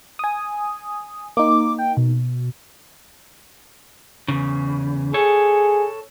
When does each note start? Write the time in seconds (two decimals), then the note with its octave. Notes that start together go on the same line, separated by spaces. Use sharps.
0.19 G#5 D#6
1.37 A#3 D#4 D6
1.78 G5
1.97 B2
4.28 E2 C#3
5.14 G#4 A4 C#5